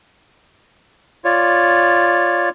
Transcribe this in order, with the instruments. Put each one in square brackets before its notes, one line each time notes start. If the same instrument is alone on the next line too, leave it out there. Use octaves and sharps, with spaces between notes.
[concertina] F4 C#5 D5